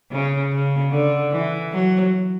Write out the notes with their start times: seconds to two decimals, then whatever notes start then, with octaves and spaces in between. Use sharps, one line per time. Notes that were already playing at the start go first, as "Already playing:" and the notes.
0.11 C#3
0.51 C#3
0.91 D3
1.32 E3
1.72 F#3